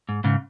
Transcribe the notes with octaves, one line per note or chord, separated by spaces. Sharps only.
G#2
G#2 C#3